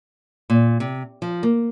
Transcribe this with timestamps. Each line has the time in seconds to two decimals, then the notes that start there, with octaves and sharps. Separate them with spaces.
0.50 A#2
0.80 C3
1.22 F3
1.43 A#3